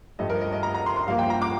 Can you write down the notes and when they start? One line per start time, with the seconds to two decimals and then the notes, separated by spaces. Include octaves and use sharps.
0.19 G2 F3 A3 D#5
0.30 A#4
0.41 D#5
0.52 D#5
0.63 A#5
0.75 A#5
0.86 C6
0.96 C6
1.07 G2 F3 A#3 F5
1.19 G5
1.30 A#5
1.42 D6